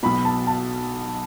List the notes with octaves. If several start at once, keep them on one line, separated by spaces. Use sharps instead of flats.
B1 B2 B5
A5
A5